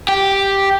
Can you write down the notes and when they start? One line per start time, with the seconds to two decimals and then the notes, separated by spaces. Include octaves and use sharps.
0.09 G4